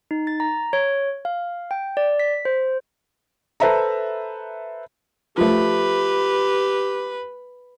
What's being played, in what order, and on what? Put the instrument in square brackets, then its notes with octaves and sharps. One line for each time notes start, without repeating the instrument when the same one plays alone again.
[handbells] D#4
A6
A#5
C#5
F5
G5
D5
B6
C5
[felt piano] A4 B4 C5 E5 A5 A#5
[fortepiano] F3 A3 [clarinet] G4 [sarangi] B4